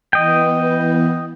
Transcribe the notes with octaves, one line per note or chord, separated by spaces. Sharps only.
E3 B3 D#5 G5